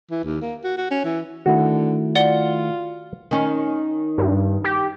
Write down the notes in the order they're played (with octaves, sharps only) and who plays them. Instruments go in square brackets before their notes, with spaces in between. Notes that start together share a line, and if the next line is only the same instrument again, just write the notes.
[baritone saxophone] E3
D#2
A#3
F#4
F#4
C#4
E3
[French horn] D3 [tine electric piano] D#3 A3 E4 [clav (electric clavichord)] F#4
[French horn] F4 [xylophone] D5 F#5 G7
[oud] D#3 C#4
[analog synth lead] G2
G4